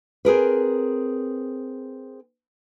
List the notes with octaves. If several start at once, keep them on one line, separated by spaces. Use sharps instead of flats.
C4 G#4 A#4 B4